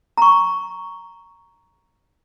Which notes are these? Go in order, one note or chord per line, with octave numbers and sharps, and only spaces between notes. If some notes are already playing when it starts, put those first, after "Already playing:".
A#5 C#6